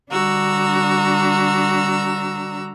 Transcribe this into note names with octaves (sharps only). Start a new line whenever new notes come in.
D3 G3 D4 F#4 A#5 E6